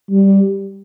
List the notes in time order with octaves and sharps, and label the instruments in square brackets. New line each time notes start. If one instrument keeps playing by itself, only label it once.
[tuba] G3